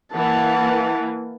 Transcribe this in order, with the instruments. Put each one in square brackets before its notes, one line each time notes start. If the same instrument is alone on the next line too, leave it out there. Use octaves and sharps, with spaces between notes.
[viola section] E3 A#3 [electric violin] F#5 A5